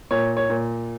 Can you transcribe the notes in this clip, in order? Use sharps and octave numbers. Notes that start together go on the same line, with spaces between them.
A#2 C#5
C#5
A#2